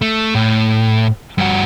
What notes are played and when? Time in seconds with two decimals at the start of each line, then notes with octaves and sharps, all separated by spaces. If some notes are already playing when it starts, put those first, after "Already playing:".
0.02 A3
0.35 A2
1.38 G2 F#4